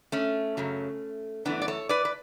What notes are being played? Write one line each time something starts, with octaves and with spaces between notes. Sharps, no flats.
A3 C#4
F#2 C#3 F#3
F#2 E3 A3 B3 D4
D5
A4 C#5
B4 D5
B4